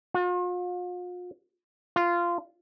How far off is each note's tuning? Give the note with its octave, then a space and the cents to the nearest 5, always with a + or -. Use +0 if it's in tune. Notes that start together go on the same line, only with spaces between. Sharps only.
F4 +40
F4 -15